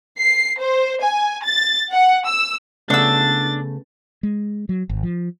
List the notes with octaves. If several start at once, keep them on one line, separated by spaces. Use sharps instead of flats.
C7
C5
G#5
A6
F#5
E6
C#3 A3 B3 D4 E6 A6
G#3
F#3
G#1
F3